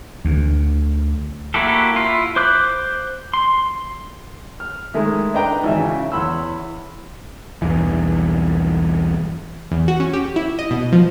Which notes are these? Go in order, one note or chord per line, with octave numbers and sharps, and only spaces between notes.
D2
A#3 E4 F#4 G4 A4
E4 F4
C5 D6 F#6 G6
C6
F6
D#3 G#3 A3 E4
D4 B4 D#5 G5 A#5
G#1 E3 E5
C#3
E2 C#5 B5 C6 E6
B1 E2 G2 E3
E2
F#4
C#4
G4
E4
D#5
B2
F3